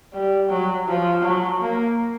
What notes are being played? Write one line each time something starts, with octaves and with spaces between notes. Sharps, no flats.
G3
F#3
F3
F#3
A#3